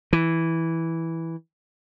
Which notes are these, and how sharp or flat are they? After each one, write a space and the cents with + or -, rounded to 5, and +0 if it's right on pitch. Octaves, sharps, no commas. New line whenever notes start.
E3 -5